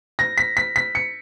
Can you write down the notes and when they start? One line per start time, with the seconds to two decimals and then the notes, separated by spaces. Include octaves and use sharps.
0.19 A#6
0.38 B6
0.57 B6
0.76 B6
0.95 C#7